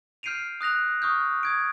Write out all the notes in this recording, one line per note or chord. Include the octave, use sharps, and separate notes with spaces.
F6 G6 C7 D7 D#7 F7
D#6 F#6 A#6 F7
C#6 D#6 F6 G6
D#6 G#6 D7